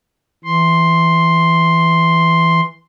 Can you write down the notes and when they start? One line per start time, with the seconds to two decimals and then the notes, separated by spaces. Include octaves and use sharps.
0.44 E3 C6